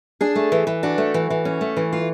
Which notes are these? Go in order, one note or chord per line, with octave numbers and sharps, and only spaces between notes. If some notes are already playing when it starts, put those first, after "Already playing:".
D4 G#4
A3
E3
E3
D4 F#4
A3
E3
E3
C#4
A3
E3
F4